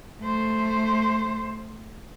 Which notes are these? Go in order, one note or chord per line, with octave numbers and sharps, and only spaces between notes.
A3 C5